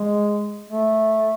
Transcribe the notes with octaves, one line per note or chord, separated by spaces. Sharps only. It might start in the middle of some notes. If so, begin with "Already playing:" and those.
Already playing: G#3
A3